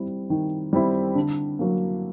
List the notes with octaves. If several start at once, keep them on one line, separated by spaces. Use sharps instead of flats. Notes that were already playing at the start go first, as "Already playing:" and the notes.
Already playing: G3 C4 E4
D#3
G3 C4 E4
D3
F#3 A#3